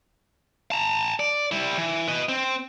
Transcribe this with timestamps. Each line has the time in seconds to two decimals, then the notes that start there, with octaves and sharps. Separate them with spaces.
0.72 A5 A#5
1.19 D5
1.52 G3 E4
1.78 E3
2.08 B4 D#5
2.29 C4